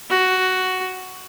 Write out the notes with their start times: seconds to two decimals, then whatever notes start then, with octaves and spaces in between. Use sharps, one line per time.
0.10 F#4